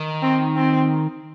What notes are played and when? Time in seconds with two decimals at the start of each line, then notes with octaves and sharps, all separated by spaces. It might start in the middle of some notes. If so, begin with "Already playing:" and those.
Already playing: D#3
0.22 C4
0.56 C4